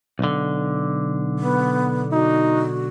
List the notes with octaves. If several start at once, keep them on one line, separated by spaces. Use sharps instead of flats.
B1 D3
B3
D#4 F#4